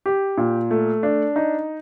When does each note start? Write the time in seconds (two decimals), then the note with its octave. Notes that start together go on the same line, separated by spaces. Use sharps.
0.06 G4
0.37 A#2
0.71 A3
1.03 D4
1.36 D#4